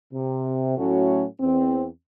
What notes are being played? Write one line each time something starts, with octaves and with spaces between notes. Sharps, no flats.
C3
A2 F#3 A3 C#4 F#4
E2 C4